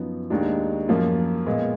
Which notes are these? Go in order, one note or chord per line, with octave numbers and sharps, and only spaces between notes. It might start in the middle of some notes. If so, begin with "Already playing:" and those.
Already playing: F#2 F3 B3 D#4
D#2 D#3 G#3 D4
F#2 F3 A#3 F4
A#2 G#3 B3